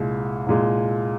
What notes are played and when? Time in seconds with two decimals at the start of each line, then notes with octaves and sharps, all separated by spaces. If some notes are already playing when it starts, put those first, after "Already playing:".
Already playing: C2 A#2 G#3
0.46 C2 A#2 G#3